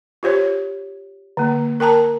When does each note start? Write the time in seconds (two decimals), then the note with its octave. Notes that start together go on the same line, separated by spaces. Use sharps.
0.23 F4 G4 C5 C#5
1.37 D3 A#3
1.80 A#4 G5 A5 A#5